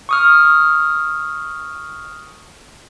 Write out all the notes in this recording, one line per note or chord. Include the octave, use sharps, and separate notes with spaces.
C#6 D#6 F6